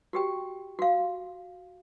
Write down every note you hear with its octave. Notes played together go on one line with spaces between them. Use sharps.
F#4 G4 G5
F#4 F5